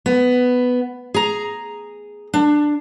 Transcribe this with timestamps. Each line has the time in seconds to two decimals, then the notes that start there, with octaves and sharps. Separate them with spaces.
0.06 B3
1.14 G#4 A#5
2.34 D4